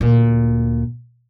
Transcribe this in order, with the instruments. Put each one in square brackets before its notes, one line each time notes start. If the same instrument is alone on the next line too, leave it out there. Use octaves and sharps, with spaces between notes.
[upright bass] D2 A#2